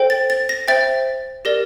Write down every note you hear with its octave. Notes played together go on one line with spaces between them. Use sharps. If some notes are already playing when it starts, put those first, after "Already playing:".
Already playing: A4 C5 G5
A6
A6
A#6
C5 E5 G5 A6
G4 A#4 D5 A#6